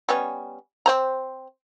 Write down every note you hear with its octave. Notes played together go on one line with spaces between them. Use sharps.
G3 B3 C#4
C4 C5 A#5